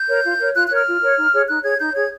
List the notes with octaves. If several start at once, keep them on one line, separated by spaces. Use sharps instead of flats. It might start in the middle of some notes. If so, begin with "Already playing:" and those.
Already playing: G6
A#4 C#5
F4
A#4 C#5
F4 F#6
A#4 C#5 F#6
F6
F4
A#4 C#5
D#4
G#4 C#5
D#4 F#6
G#4 C#5 G#6
D#4 G6
G#4 C#5 G#6